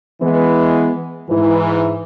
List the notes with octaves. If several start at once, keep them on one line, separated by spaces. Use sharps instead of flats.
E3 G#3 B3
G#2 E3